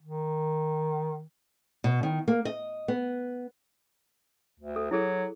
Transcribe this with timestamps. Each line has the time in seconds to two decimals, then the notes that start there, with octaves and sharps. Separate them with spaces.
0.03 D#3
1.84 B2
2.03 D#3
2.28 A#3
2.45 D#5
2.88 B3
4.60 D2
4.76 A4
4.91 F#3 E4 G#4 A4